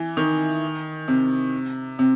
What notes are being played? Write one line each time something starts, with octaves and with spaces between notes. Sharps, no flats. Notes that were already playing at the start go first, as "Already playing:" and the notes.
Already playing: E3
D#3
C3
C3